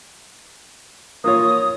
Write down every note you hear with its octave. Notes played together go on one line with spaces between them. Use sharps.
A#3 F4 C#5 D#6